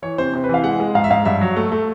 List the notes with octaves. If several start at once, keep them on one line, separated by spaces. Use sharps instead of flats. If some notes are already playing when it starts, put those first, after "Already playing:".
E3 C#5
C3 C5
C3
B4
E3 F5
G#3 F#5
G#3
G#2 F5
E5
G#2 F5
G2 E5
F#3
A3
A3